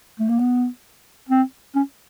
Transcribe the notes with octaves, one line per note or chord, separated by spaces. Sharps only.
A3
A#3
B3
C4
C#4